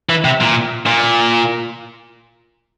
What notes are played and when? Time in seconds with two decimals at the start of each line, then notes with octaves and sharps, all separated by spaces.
0.09 E3
0.25 C3
0.41 A#2
0.86 A#2